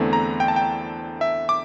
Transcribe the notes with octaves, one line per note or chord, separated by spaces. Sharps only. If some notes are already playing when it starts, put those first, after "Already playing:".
Already playing: E2 D3 A3 C4 E4
A#5
G5
A5
G5
E5
D6